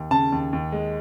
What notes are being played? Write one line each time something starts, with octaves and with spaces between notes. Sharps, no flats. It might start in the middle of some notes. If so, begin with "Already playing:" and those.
Already playing: D#2
C#3 A5
D#2
D#2
G#3